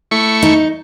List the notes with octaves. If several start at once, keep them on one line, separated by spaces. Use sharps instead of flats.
A3 E4 C#6
D#4